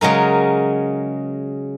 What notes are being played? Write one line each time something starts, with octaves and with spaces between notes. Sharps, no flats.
C#3 F#3 G#3 A#4